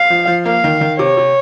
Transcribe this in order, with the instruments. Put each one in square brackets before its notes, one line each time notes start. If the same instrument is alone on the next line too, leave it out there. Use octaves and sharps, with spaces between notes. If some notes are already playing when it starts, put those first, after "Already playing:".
Already playing: [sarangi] F5
[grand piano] F3
F3
[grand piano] A#3 [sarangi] F5
[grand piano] D#3
D#3
[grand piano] C3 [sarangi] C#5
[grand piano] C3